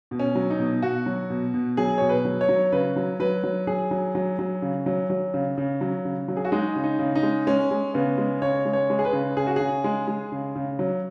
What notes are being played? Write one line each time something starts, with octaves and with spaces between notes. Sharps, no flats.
B2
C#4
F#3
D#4
B2
B2 F#4
F#3
B2
B2
F#3 G#4
B2 C#5
B4
F#3
C#5
F#3
C#3 B4
F#3
F#3 B4
F#3
F#3 G#4
F#3
F#3
F#3
C#3
F#3
F#3
C#3
C#3
F#3
C#3
F#3
G#4
F#4
G#3 D#4
C#3
D#4
C#3
D#4
G#3
G#3 C#4
G#3
C#3 B3
G#3
C#3 C#5
G#3
C#5
G#3
G#4
B4
C#3
C#3 G#4
F#4
C#3 G#4
G#3
G#3
C#3
C#3
F#3